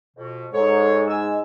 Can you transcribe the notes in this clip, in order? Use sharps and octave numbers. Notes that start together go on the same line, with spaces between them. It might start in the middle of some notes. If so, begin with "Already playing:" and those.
F2 B2
G#2 A4 C#5
D#5 G#5 E6